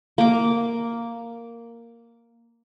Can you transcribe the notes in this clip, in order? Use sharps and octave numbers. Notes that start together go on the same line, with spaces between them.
A#3 D6